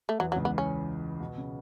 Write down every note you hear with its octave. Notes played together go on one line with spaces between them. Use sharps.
A3
E2 E3 F#3
F#3
C#2 C#3
B3
C#4
B2
C#3